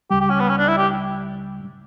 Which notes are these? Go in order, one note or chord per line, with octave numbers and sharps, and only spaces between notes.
C#2 C#3 G3 G4
G4
C#4
B3
C#4
D4
E4
G4